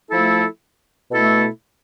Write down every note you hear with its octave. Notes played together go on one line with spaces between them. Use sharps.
F3 A3 E4 A4
B2 A3 E4 A4